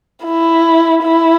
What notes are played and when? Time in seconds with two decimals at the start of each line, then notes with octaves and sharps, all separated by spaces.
0.25 E4
1.03 E4